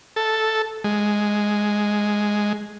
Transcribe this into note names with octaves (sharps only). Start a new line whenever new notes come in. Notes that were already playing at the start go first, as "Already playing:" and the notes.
A4
G#3